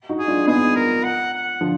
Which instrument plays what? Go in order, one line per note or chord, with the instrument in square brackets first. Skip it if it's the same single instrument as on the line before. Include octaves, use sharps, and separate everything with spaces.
[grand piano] D#4 F#4
[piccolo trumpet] G#4
[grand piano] D4 F4
[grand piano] B3 D#4 [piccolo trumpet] G#4
[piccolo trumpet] A#4
F#5
F#5
[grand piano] D3 F3